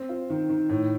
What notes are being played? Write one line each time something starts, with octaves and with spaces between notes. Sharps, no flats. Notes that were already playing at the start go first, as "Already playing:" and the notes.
Already playing: C4
F4
D#3
D#3
A2